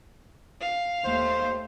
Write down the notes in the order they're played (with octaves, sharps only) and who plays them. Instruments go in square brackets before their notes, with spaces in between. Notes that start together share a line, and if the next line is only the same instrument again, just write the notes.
[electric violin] F5
[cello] D#2 A3 [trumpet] C5